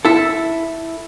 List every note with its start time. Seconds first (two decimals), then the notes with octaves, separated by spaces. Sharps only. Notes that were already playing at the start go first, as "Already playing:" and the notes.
0.05 E4 A4